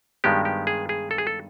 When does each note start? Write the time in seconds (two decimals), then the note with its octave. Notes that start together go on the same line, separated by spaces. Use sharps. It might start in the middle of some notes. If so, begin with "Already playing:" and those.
0.24 G2 D#3 G#3 B3 G4
0.45 G4
0.67 G#4
0.89 G#4
1.11 A4
1.18 G#4
1.27 A4